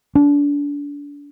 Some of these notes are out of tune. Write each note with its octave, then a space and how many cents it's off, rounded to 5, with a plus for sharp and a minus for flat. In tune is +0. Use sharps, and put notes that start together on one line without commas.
D4 -30